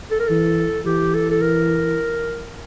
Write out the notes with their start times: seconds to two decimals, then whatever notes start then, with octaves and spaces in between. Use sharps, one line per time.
0.11 A4
0.20 A#4
0.28 E3 A4
0.85 E3 G4
1.14 A4
1.30 A4
1.41 A#4